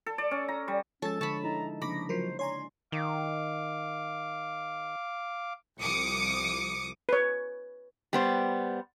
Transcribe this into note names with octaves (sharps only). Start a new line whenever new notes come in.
A4
D5
C#4
A#5
G3
F3 G#3 C#4 A4 C#5 A6
D3 A5 B5 C#6
D#4 E4 A#5
C#3 F3 A#3 D4 B5 C#6 D6 A#6
F3 F#3 A#4 C5
C#5 D5 G#5 A#5 C6
D#3 F5 D6
C2 F3 D6 D#6 C#7
B4 C#5
G3 B3 C5